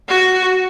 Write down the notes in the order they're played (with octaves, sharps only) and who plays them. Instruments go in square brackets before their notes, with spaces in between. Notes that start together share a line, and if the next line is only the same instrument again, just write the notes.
[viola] F#4